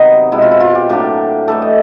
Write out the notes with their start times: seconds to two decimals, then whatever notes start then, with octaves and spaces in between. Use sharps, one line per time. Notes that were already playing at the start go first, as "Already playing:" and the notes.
Already playing: C3 D#3 F#3 B3 D#4
0.32 B2 G#3 C4 E4
0.42 F4
0.51 E4
0.60 F4
0.75 G4
0.89 A2 F#3 A#3 D4 G4
1.48 A2 E3 A3 A4
1.62 D#5